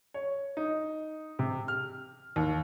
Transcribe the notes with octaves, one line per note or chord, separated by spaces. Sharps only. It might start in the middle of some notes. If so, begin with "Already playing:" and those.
C#5
D#4
C3
F6
D#2